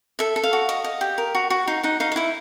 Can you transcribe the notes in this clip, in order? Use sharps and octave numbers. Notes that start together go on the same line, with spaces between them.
A4 E5
A4
F5
F#4
D#5
D#5
G4
A#4
F#4
F#4
D#4 F5
D#4 F#5
D#4 F5
F5
E4 E5